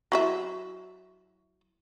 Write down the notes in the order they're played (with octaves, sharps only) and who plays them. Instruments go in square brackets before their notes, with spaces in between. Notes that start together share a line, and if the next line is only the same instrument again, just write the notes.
[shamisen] F#3 E4 E5